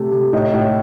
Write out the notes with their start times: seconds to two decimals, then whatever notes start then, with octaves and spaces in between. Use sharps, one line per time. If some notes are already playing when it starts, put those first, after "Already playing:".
Already playing: C3 A3
0.11 C3
0.33 A2 D#4
0.54 A2